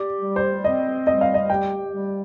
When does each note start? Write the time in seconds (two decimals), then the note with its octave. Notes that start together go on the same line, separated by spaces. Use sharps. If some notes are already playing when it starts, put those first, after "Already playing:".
Already playing: G4 D5
0.21 G3
0.36 C5
0.64 C4 D#5
1.07 G3 D#5
1.21 F5
1.34 D#5
1.49 G4 G5
1.92 G3